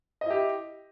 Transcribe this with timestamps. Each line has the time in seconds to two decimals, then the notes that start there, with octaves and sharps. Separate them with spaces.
0.21 D#5
0.26 E4
0.30 G4